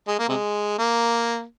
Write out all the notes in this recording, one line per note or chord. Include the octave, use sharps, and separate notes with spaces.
G#3
A#3
C3 G#3
A#3